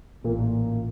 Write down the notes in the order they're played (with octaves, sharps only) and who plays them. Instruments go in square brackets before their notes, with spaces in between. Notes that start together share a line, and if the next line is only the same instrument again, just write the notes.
[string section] A1 [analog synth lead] A#2